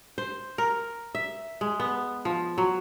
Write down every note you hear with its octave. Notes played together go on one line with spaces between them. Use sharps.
C5
A#4
E5
G#3
B3
F3
F#3